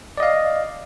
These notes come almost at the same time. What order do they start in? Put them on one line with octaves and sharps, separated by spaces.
D5 D#5 F5